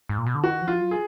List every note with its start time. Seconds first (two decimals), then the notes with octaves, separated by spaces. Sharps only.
0.09 G#2
0.18 A#2
0.26 B2
0.35 D3
0.44 D#3 F#4
0.61 F3
0.68 F4
0.80 F#3
0.91 G#4